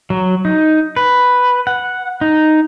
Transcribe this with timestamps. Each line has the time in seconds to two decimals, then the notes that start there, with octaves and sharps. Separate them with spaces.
0.10 F#3
0.45 D#4
0.96 B4
1.67 F#5
2.21 D#4